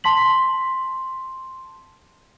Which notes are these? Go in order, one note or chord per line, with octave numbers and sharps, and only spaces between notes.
A5 C6 B6 F#7